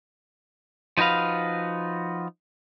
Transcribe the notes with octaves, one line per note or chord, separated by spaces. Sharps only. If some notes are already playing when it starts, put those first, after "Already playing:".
F3 D#4 F#4 B4 F5